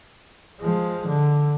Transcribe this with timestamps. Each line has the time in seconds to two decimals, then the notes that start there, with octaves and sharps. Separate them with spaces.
0.60 F3 G#3
1.07 D3